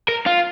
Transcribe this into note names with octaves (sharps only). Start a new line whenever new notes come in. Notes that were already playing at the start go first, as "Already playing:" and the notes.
A#4
F4